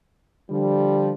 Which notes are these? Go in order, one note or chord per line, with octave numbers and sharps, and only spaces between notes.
D3 F3 G3